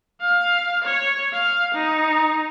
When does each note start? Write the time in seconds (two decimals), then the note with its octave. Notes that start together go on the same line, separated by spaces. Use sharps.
0.21 F5
0.84 C#5
1.33 F5
1.75 D#4